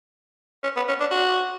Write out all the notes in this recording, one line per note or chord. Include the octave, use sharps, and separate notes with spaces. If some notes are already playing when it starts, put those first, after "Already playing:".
C#4
B3
C#4
D4
F#4